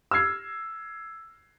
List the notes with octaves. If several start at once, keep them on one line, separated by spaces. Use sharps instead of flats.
E6 F6 G#6 C7